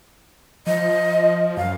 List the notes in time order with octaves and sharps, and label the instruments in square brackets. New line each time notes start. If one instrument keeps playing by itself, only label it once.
[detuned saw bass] F3 [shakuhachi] D#5
[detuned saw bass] F#2 [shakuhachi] F5